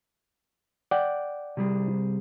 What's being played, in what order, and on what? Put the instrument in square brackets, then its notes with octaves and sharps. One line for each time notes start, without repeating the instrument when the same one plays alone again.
[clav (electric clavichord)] D5 F#5 G5
[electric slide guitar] C3 G3 G#4